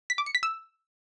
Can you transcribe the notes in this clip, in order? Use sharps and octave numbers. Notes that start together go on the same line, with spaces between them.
B6
D6
C#7
B6
E6